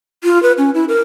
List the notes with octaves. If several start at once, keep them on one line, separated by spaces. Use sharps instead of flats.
F4
B4
C#4
E4
A#4